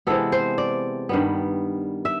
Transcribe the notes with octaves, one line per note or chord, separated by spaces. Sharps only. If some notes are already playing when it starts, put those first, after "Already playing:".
C3 E3 G#3 B3 A4
C5
D5
G2 D#3 G3 B3
E5